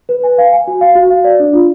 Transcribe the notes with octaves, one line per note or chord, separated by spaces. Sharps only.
B4
G#5
F5
G#5
F#4
F5
F#4
F5
D5
D4
F4